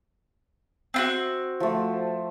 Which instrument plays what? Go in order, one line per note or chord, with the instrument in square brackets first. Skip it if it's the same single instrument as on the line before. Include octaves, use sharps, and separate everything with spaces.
[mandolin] C4 F4 F#4
[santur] F3 A3